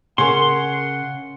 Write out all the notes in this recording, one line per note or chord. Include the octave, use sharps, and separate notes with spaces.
C#3 C#4 G#4 A#4 C#5 F#5 C6